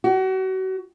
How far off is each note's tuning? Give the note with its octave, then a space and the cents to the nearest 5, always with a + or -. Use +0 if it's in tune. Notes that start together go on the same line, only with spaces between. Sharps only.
F#4 +35